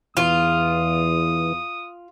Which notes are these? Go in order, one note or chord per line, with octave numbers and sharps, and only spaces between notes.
E2 E3 F4 D#6